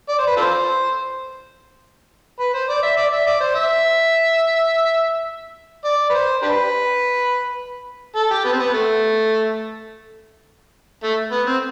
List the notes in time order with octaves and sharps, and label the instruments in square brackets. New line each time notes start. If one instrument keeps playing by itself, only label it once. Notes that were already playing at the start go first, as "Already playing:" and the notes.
[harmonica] D5
C5
B4
F4 A4 C5
B4
C5
D5
E5
D5
E5
D5
C5
E5
D5
B4
C5
D4 G4 B4
A4
G4
B3
C4
B3
A3
A3
B3
C4